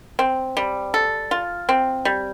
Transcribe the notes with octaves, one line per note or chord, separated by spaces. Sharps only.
C4
G3
A4
F4
C4
G3